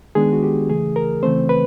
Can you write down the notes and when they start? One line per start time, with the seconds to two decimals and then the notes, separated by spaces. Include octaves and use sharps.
0.15 D#3 G#3 B3 D4 G#4
0.32 F#4
0.43 G4
0.69 C#3 E3 A3 G#4
0.96 A#4
1.23 C#3 E3 A3 C4 C5
1.49 B4